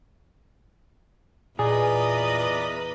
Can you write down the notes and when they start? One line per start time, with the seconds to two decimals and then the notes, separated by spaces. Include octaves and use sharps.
1.59 E2 A#2 G#4 B4 D5 D#5 A#5